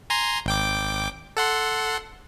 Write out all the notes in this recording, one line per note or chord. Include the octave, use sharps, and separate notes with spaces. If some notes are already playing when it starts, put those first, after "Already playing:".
G#5 A#5 C6
G#1 G5 D6
A4 F#5 C6